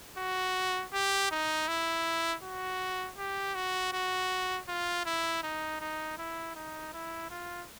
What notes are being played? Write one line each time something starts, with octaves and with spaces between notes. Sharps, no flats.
F#4
G4
D#4
E4
F#4
G4
F#4
F#4
F4
E4
D#4
D#4
E4
D#4
E4
F4